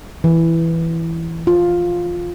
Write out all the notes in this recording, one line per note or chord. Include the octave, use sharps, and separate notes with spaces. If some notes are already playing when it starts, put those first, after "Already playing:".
E3
F4